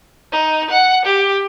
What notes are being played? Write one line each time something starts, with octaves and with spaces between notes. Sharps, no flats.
D#4
F#5
G4